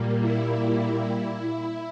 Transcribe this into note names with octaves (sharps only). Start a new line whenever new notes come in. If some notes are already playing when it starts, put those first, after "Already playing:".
Already playing: A#2 G3 A#3
E4
E4